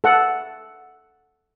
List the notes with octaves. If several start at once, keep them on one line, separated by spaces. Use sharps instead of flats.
A4 F#5